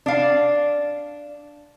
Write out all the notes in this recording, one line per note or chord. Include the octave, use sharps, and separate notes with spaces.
D4 F5